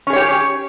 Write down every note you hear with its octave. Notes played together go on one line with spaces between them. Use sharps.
C#4 G4 G#4 C#5